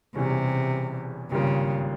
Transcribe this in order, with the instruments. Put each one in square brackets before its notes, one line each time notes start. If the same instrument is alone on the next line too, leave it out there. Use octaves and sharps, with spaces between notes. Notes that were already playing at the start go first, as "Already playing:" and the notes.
[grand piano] E1 E2 E3 G3 C#4 [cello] C3
[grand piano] G#1 G2 G3 A#3 F4 [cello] C#3